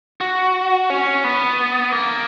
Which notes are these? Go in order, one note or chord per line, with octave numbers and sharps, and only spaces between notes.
F#4
C#4
B3
A#3